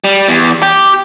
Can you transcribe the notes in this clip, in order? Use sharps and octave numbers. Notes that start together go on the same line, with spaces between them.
G3
E2
G4